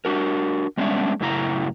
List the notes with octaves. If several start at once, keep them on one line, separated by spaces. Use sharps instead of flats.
D4 F#4 A#4
G3 G#3 B3 C#4 D4 E5
F#2 A2 C#3 E4 G4 A#5